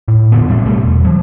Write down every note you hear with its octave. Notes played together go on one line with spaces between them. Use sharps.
A2
F2 A#2 D3 B3
A1 G3 C4
D2 B2 G3 A3
E1
E3 F#3